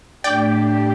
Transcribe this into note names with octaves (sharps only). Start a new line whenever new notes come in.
A2 A3 D4 G4 D5 G5